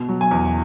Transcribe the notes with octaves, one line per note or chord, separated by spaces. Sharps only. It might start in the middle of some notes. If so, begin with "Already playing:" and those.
Already playing: B2
F#3
G#5
E2